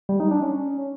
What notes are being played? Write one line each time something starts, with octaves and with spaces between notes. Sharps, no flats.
G3
D#4
D4
C#4